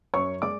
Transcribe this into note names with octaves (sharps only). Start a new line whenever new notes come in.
F#2 C#5 C#6
G#3 D5 D6